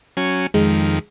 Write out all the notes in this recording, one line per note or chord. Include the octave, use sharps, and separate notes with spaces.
F#3 C#4 G#5
F2 D#3 G#3